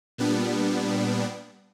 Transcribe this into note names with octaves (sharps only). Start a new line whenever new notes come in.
A#2 G3 B3 D4